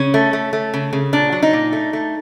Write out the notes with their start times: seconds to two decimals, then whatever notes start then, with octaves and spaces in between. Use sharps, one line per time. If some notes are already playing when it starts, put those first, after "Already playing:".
Already playing: C#3 C#4
0.14 A3
0.33 A3
0.53 A3
0.74 C#3
0.93 C#3
1.13 A#2 D4
1.32 F#3
1.43 D#4
1.53 A#2
1.73 A3
1.93 A3